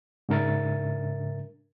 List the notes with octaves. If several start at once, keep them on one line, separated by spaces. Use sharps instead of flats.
G#2 C#3 D4 A#4 E5 A6